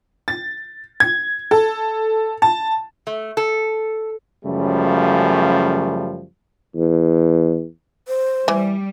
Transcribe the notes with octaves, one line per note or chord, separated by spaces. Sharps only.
A6
G#6
A4
A5
A3
A4
F#2 C#3 F3 G3 A3
E2
C5
E3 G3